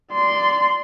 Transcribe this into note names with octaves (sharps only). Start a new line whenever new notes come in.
D5 C6